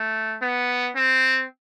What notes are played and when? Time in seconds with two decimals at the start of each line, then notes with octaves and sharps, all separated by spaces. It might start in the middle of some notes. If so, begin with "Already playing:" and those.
Already playing: A3
0.42 B3
0.96 C4